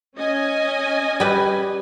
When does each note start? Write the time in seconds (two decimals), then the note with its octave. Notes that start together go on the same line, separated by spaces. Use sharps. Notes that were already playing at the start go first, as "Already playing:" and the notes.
0.16 C#4 D#5 G#5
1.20 G3 B4